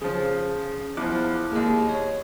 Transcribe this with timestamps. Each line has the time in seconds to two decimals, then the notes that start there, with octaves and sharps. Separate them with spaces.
0.02 C#3 F3 C#4 G#4
0.97 E2 F3 E4 D6 F#6
1.52 D#2 G#3 A#3 D#5
1.89 C#5